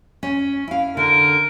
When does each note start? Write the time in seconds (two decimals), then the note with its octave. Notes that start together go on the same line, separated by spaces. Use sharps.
0.23 C#4
0.68 E4 F5
0.97 D3 A#4